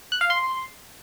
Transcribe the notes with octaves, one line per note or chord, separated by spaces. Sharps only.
F#6
F5
C6